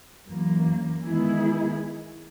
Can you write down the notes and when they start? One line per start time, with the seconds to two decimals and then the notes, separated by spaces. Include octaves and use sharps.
0.27 F#2 E3 A#3
1.05 D#3 G#3 B3 E4 G#4